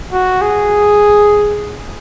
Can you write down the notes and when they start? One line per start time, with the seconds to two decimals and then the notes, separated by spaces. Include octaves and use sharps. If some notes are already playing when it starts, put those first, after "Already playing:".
0.13 F#4
0.42 G#4